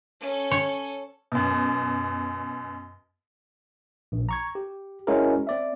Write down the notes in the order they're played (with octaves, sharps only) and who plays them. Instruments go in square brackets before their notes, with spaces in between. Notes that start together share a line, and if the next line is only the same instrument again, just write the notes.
[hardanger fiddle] C#4 A4
[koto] C#5
[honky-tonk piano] F#2 B2
[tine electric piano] A#1
A#5 C#6 G#6
G4
G#3 C#4 E4 F#4 G#4 A#4
C4 D5 E5